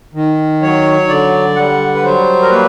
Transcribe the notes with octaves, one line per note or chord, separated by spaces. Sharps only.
D#3
F#3 C#5
D3 D5
G3 F#5
B4
F#3 C5
A#4
A#3 B4